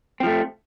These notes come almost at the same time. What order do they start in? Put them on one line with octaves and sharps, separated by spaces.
C4 F3 A3